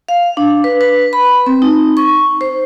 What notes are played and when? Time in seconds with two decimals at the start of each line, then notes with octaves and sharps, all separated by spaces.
0.09 F5
0.37 D4
0.64 B4
0.81 B4
1.13 B5
1.46 C4
1.62 D#4
1.97 C#6
2.41 C5